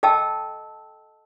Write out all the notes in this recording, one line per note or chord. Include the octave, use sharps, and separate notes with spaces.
A4 D#5 G5 A5 E6